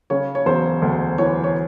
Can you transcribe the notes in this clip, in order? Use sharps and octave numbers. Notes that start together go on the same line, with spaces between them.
C#3 C#5
C#5
E1 C5
D2
E3 C#5
C#5